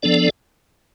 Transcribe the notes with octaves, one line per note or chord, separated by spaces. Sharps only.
F3 B3 D4 A4 D5